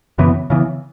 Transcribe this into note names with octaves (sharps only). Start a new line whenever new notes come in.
F#2 C#3 E3 B3
C#3 E3 B3